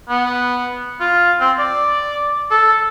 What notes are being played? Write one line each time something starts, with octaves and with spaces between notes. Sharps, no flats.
B3
F4
C4
D5
A4